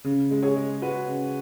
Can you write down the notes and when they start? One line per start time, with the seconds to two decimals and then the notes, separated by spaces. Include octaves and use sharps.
0.04 C#3
0.31 G#3
0.43 G#4 C#5
0.56 G#3
0.82 G#3 F#4 B4
1.08 C#3